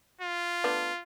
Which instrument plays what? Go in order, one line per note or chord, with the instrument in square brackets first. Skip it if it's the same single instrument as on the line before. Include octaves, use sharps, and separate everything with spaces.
[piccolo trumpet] F4
[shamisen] A3 B3 D4